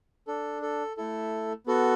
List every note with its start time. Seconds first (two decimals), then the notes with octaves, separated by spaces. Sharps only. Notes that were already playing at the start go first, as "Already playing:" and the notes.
0.27 D4 A4
0.62 A4
0.97 A3 E4 A4
1.66 B3 F#4 A4